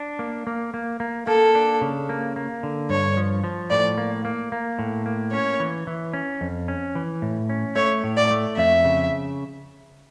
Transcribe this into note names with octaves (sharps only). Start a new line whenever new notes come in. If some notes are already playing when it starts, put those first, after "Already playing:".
Already playing: D4
A#3
A#3
A#3
A#3
A#3 A4
D4
C#3
A#3
A#3
D3
G2 C#5
F3
F3
A2 D5
A#3
A#3
A#3
A2
A#3
C#4 C#5
E3
E3
C#4
F2
C#4
E3
A2
C#4
A3 C#5
A2
D5
A3
F2 E5
C#3